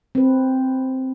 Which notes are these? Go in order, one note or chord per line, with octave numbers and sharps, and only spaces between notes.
C4 B4